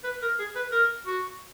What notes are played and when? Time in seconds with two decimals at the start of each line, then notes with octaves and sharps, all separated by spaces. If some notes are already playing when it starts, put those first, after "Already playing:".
0.04 B4
0.22 A#4
0.39 G#4
0.55 B4
0.72 A#4
1.06 F#4